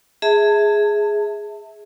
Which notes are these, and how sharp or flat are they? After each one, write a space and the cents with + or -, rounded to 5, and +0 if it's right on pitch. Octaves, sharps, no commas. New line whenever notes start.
G#4 +0 E5 -20 A5 +30